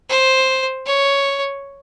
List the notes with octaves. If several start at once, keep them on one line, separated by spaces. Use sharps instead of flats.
C5
C#5